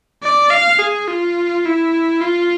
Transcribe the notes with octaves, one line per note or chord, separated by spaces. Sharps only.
D5
F5
G#4
F4
E4
F4